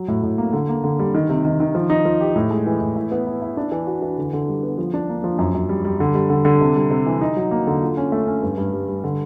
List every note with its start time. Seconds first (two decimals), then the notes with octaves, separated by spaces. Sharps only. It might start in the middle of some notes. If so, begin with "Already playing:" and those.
Already playing: F#3
0.08 A2
0.23 A2
0.38 A#3
0.53 D3
0.69 A#3
0.84 D3
0.99 G3
1.15 D#3
1.29 C3
1.45 D#3
1.60 D#3
1.75 F3
1.90 D#4
2.05 F3
2.20 G4
2.36 A2
2.51 G#3
2.66 E3
2.81 A2
2.96 E4
3.12 B3
3.27 E4
3.42 E4
3.57 D4
3.72 E3
3.87 F#4
4.02 E3
4.18 D3
4.33 D3
4.48 G3
4.63 B3
4.78 F3
4.94 D4
5.09 A#3
5.24 F3
5.39 F#2
5.54 F#2
5.69 G3
5.85 G3
6.00 D3
6.14 G3
6.30 D3
6.45 D3
6.61 C3
6.76 G3
6.91 C3
7.06 E3
7.21 D#4
7.36 F#3
7.51 A#3
7.67 D3
7.82 F4
7.97 C#4
8.12 A3
8.27 C#4
8.42 G2
8.58 G2
8.73 G3
8.88 G3
9.04 D3